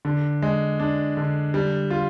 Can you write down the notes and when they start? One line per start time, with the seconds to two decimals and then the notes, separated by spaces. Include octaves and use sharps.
0.05 D3
0.42 G#3
0.79 D4
1.17 D3
1.54 G3
1.90 F4